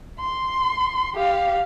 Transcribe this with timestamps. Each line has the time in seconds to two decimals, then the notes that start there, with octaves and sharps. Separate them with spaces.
0.20 C6
1.15 G4 F5